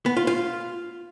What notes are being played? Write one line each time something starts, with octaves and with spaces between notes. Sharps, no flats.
B3
F4
F4